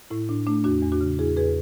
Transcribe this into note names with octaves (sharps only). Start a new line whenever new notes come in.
A2 E4
A2 D4
A3 D4
E2 D4 F#4
E2
D4 F#4
C#3
E2 E4 G#4
E2 G#4 B4